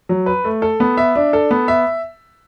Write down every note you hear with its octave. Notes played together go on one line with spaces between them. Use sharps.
F#3
B4
A3
A4
B3
E5
D4
A4
B3
E5